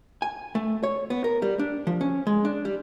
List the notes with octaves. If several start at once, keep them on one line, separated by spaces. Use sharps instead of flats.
G#5
A3
C#5
B3
A#4
G3
D4
F3
C#4
G#3
D4
G3